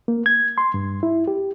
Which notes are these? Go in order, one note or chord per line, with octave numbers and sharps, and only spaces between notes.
A#3
G#6
C6
G2
E4
G4